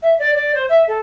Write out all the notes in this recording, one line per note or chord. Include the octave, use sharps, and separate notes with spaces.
E5
D5
D5
C5
E5
A4